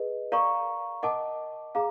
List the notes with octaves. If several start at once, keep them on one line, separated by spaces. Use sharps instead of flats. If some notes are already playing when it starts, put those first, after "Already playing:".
Already playing: G#4 B4 D#5
A#4 D5 F5 A#5 C#6
A#4 D#5 F#5 A5 D6
G#4 F5 A#5 D6